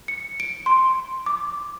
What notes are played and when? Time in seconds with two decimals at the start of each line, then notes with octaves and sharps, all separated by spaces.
0.08 C#7
0.40 D7
0.66 C6
1.26 D6